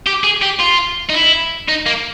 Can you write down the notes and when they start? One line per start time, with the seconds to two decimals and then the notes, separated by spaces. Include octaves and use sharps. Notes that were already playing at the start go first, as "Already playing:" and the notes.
0.06 G4
0.24 G#4
0.42 G4
0.60 F4
1.09 D#4
1.14 E4
1.68 D#4
1.86 A#3